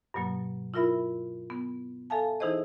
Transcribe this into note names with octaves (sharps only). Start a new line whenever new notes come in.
G2 B2 F#3 A#3
E4 F4 A#4 E5 B5
B3
A4 E5 F5 G#5 A5
E3 D#4 E4 G#4 C5 D#5